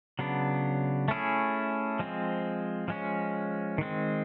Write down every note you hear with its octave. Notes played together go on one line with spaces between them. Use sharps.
C#3 F#3 B3 D4
A3 C#4 E4 G#4
F3 G#3 C4
F3 G#3 C#4
D#3 G#3 C4